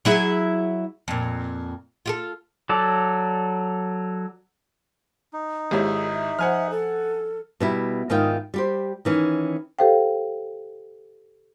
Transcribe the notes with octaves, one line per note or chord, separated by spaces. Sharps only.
F#3 E4 G#4
F2 A#2
F4 G4 A4
F#3 A4 D5
D#4
G#1 G#2 E4 G4 G#4 C#5
E5
F3 C5 F#5 G#5 F6
A4
B2 G3 E4
G#2 D#3 E4 F4 D#5 G5
G3 G4 C5
D#3 E3 C#4
G4 A4 C5 F5 G5